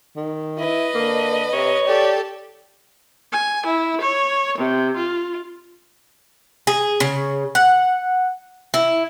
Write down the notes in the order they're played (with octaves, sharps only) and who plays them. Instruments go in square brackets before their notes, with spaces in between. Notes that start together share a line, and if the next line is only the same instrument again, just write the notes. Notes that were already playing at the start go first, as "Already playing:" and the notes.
[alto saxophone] D#3
[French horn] E4 [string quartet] B4 D#5
[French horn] D3 [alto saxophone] A#3
[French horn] C3 [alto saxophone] C#5
[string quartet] G4 A4 [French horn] D5
[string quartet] G#5
E4
C#5
C3
F4
[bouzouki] G#4
C#3
F#5
E4